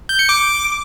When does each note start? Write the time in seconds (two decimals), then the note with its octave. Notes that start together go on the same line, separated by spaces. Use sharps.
0.09 G6
0.19 C#7
0.29 D6